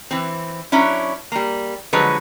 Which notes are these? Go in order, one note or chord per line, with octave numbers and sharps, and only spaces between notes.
E3 C4
F#3 C#4 D4 E4
G3 A#3
D3 F3 F#3 G#3 F#4 B4